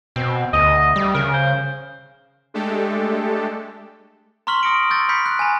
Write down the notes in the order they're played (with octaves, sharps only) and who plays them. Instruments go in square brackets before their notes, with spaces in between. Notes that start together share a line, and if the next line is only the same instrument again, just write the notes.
[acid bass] B2 [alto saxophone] C4
[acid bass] D2 [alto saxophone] D#5
[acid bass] G3
[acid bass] C#3 [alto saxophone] A#4
[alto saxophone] C5
[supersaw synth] G#3 A3 D4 G4 A4
[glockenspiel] A#5 C6 C#6 F6 B6 F#7
A#5 D#6 A#6 C#7 D7
C#6 E6 G6 A6
B5 F6 G6 B6 C#7
F#6
G#5 A#5